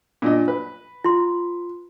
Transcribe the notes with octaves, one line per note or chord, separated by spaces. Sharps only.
A#2 D4 D#5
B4
F4 C6